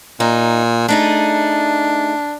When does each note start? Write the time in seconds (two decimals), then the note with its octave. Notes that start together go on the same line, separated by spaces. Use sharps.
0.20 A#2 D#4
0.88 A3 D4 D#4 G#4